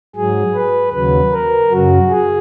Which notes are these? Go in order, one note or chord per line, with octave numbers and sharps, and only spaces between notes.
G#2 F#3 G#4
B4
D#2 C#3 F#3 B4
A#4
F#2 C#3 F#3 F#4
G#4